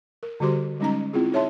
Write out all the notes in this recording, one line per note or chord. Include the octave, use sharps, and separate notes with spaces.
A#4
D3 G3 F#4 G4 C5 C6
G3 G#3 C#4 D#4 D#5 A#5
C4 E4 F4 G#4
D#4 G#4 C#5 E5 A5 C6